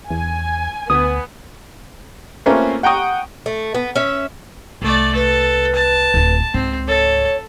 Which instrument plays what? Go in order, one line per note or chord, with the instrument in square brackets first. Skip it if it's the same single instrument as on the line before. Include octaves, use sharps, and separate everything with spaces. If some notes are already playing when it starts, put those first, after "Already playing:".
[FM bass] E2 [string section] G#5
[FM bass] D2 [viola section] B3 [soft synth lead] D#6
[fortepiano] A3 A#3 C4 C#4 F4 B4
F#5 G5 A#5 C#6 D#6
[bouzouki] A3
B3
C#4 E5
[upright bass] C2 [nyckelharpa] A3 D5
[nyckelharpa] A4 [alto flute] B4
[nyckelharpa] A5
[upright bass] D1 F4
[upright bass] C#2 G#2 [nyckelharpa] C4
[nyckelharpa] A4 [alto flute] C#5